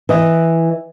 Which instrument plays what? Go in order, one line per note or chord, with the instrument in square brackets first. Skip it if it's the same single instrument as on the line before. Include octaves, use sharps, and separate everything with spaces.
[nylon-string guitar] E3 D#5